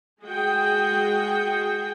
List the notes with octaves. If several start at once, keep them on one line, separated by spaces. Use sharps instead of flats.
G#3 F#4 G#4 G5